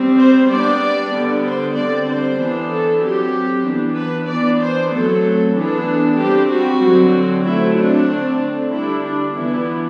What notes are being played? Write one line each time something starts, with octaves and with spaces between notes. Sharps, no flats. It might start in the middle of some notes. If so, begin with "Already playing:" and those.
Already playing: G3 C4
C5
G3 B3 D4 D5
D3 G3 B3
C5
D3 G3 C4 D5
C5
E3 B3 D4
A4
F#3 C4 G4
E3 B3 D4
B4
E3 B3 D4 D5
C5
F#3 A3 C4 A4
E3 B3 D4 A4
G3 C4 G4
F#4
D3 F#3 C4
F#3 A3 C4 E4
D4
D3 A3 C4
D3 G3 D4 E4
D4
E3 B3 D4 E4